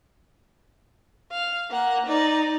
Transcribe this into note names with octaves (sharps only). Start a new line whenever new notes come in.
F5
A#3 F#5
D#4 D5